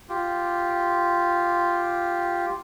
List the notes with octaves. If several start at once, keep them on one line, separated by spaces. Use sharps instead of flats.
F4 G4